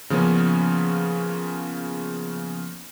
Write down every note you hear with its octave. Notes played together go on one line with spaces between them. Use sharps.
C#3 F3 A#3 B3 C#4